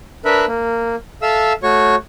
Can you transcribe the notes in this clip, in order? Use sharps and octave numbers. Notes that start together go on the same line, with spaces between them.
D4 A#4 B4 E5 B5
A#3
A4 E5 F5 E6
A3 F#4 C#5 C#6